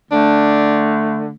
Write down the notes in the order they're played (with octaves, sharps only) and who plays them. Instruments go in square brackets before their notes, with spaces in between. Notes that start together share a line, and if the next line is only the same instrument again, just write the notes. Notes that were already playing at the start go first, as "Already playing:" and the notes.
[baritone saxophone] D3 [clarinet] A3 [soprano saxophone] D4